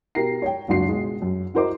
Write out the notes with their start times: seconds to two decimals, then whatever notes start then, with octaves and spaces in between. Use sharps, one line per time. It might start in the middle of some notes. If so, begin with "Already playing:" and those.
0.15 B2 G4 A#4 A#6 C7
0.42 C#5 G5
0.68 F#1 C#2 D4 F#4 C6 C7
0.88 B2 G#3
1.22 F#2
1.54 E4 F#4 A#4 C5 D#5 D6